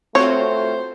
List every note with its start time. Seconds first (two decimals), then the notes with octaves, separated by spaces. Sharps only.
0.15 A3 C4 F4 F#4 C5 C#5